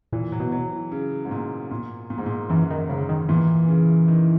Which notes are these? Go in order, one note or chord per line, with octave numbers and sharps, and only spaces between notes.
A#2 E3
F#3
B2
F#3
E3
C#3
G#2
A#2
A#2
A#2
G#2
A#2
F#2 E3
D#3
G#2 C#3
D#3
A#2 E3
C#3
D#3